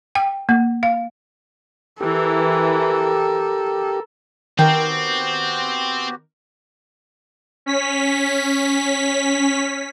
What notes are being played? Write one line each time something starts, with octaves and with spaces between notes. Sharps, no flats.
G5
A#3
F5
E3 G4 A4 A#4
D#3 B3 C4 F#4 G4 A#4 G5
C#4 B6